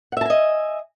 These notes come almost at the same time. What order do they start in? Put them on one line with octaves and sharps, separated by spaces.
F#5 E5 A5 G#5 D#5